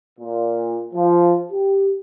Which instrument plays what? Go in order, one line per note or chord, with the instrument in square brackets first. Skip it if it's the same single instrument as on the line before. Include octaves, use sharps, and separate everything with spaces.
[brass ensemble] A#2
F3
G4